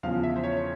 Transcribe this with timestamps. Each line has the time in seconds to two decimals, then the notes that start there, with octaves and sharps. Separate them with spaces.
0.03 E2 C#3 F3 F5
0.23 E5
0.36 C5
0.44 C#5
0.57 C#5